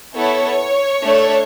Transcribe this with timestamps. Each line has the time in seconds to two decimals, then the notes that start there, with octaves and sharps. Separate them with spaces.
0.15 B3 E4 A4 C#5
1.01 A3 D4 A4